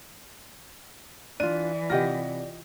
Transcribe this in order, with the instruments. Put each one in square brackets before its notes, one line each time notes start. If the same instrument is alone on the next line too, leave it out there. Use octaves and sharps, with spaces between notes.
[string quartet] E3 [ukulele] D4 F4 [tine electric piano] D5 [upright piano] D#7
[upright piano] C3 F#5 A#6 [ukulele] F4 G4 D#5